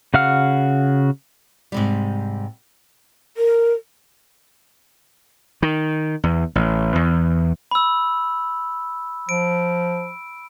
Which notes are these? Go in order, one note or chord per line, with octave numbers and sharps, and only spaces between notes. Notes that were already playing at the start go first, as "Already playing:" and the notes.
C#3 F#4 F5 F#5 F6
G#2 C3 G3
A#4
D#3
E2
A1
E2
B5 E6
F3 D7